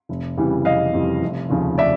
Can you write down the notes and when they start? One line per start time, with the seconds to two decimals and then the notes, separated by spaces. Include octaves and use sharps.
0.09 F1
0.37 F2 C#3 E3 G3
0.65 F1 D#5 F5
0.93 F2 C#3 E3 G3
1.22 F1
1.50 D#2 C#3 F3 A3
1.78 D5 E5